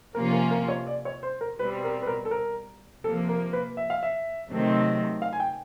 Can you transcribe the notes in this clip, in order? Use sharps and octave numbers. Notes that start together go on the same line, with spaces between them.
C3 F3 A#3 C#4 F4 A#4
A#4
A#4
C#5
D5
C#5
C5
A#4
B2 G3 C4 B4
A#4
B4
A#4
A4
A#4
C3 F3 A#3 A4
A#4
B4
E5
F5
E5
C3 D#3 F#3 A3 C4
F5
G#5
G5